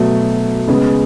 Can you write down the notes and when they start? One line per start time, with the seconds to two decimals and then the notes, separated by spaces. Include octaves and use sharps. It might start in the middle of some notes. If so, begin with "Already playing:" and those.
Already playing: B2 F#3 A3
0.67 C#3 G#3 B3